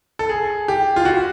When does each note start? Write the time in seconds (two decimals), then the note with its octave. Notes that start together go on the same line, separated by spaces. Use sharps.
0.19 A4
0.29 G#4
0.68 G4
0.96 F4
1.05 F#4